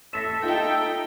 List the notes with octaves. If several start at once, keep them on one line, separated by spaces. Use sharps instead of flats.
A4 E5 A#6 B6 E7
D#4 F4 G5